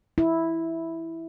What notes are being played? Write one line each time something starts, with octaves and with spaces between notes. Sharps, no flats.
E4